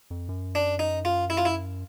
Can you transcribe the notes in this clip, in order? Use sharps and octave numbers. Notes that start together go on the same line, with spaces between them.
F2
F#2
D4
D#4
F4
E4
F4
E4